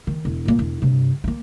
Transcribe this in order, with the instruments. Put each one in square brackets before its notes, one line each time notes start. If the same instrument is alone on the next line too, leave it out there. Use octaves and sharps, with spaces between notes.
[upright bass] D#3
E1
A#2 A#3
E1
G2 C3
A#3 B3